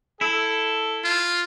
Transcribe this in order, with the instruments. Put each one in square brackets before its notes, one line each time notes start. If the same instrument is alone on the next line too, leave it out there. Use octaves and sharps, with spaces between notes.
[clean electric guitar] E4 [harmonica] A4
[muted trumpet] F4